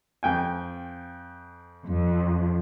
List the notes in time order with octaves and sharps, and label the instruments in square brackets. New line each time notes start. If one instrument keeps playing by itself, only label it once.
[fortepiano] F2 G5 G#5
[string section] F2